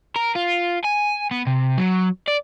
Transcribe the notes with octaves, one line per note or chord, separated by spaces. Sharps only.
A#4
F4
G#5
B3
C3
F#3
D5